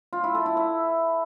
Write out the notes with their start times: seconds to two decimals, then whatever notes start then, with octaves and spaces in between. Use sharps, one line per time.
0.13 F4
0.24 E4
0.35 A4
0.46 E4
0.57 E5